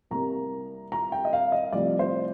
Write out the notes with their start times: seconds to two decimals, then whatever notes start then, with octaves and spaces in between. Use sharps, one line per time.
0.11 C2 C3 G3 A#3 A#5
0.92 A#5
1.12 G5
1.25 D#5
1.33 F5
1.52 D#5
1.72 C2 C3 F3 A3 D5
1.99 C5